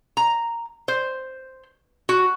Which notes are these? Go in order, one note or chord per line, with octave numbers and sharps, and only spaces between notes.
A#5
C5
F#4